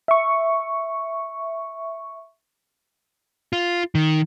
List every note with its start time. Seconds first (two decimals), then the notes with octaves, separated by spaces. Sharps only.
0.08 E5 C#6
3.53 F4
3.95 D#3